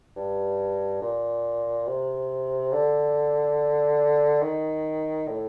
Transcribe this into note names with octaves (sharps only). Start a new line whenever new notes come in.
G2
A#2
C3
D3
D#3
A2